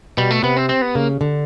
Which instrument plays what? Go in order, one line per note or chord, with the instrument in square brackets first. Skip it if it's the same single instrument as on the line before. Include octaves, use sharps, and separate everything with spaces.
[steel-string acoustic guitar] B2 [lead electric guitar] G3
[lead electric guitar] A3
[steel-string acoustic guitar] C3 [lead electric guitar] B3
[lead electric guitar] C4
C4
B3
[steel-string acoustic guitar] C#3 [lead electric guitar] A#3
[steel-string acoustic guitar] D3